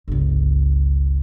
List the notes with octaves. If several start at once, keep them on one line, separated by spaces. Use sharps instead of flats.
G1 C#2